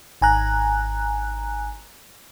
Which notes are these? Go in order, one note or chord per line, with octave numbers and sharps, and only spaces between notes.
G#1 G#5 A#5 F#6